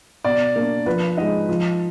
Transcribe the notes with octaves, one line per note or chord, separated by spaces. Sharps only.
B2 D5
A#3 D4
F3 B4
G#3 D#4 D#5
F3